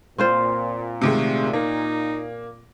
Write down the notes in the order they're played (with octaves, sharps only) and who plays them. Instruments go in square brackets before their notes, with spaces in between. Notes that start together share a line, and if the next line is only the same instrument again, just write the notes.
[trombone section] A#2 [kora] C4 F4 C5
[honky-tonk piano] C3 D#3 G#3 [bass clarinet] A3
[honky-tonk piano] A#3 [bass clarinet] D#4